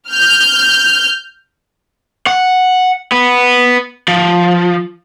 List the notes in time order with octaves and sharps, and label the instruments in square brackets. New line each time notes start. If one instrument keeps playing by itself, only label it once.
[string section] F6 G6
[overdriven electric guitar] F#5
B3
F3